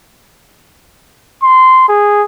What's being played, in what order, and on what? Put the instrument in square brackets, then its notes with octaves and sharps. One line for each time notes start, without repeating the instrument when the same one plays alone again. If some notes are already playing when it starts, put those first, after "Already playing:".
[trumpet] C6
G#4